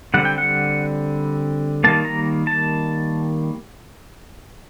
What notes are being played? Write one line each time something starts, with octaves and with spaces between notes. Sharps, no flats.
D3 G3 C4 F#5
G5
F#5
D#3 G3 A#3 A5
A#5
A5